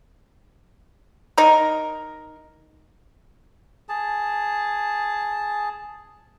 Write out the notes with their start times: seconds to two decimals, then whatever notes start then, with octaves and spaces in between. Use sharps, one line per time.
1.38 D#4 A#4
3.89 G#4 A5